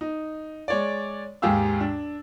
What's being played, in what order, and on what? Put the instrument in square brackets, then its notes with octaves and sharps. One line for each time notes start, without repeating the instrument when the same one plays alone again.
[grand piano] D#4
G#3 C#5 D5
D#2 G#2 G4 G#4 F5 E6
D4